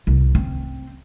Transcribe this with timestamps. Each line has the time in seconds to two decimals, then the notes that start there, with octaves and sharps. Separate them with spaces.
0.07 C2
0.35 C4